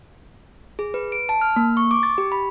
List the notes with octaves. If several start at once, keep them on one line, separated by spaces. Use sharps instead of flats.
G#4
B4
D7
A5
F6
A#3
C#6
D6
A6
G4
B5